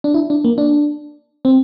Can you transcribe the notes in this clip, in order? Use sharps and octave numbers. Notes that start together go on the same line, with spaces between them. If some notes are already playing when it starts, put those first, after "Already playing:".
D4
E4
D4
A#3
D4
C4